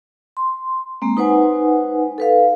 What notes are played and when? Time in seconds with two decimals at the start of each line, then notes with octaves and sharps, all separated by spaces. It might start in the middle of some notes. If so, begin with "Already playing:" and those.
0.37 C6
1.02 G#3 A#3 C4
1.17 D#4 B4 C5 F#5 G#5
2.18 A4 B4 F5